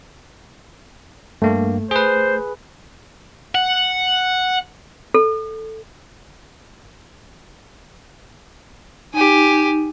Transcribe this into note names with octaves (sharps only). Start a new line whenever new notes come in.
G2 A3 A#3
G#4 B4 C5
F#5
A4
D#4 G4 G#5